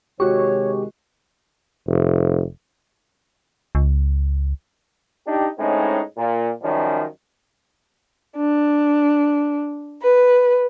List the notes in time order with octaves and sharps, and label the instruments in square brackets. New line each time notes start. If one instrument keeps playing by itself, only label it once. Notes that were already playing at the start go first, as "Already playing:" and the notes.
[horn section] C3 D#3 G#3 [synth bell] F#4 C#6 [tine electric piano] G4 [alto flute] C#5
[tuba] F1
[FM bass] C#2
[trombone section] D4 D#4 G4
A2 G#3 C4 C#4 D#4
A#2
F#2 D#3 F3 G3 C#4
[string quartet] D4
B4